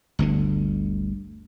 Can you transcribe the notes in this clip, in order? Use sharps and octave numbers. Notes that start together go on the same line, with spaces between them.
G1 D2 D3